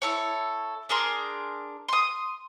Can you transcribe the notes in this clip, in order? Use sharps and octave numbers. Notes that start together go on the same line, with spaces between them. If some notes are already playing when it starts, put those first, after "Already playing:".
E4 A4 C#5
D4 G#4 A#4 C6
C6 D#6